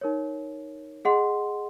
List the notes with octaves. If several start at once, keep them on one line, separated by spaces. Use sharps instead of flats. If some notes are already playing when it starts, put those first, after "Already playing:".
D#4 A#4 C#5
G#4 D#5 F#5 C6